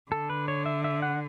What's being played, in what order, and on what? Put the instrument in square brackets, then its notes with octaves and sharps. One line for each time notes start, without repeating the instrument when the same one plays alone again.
[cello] D3 [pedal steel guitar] A4
[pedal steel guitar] B4
C#5
E5
E5
F#5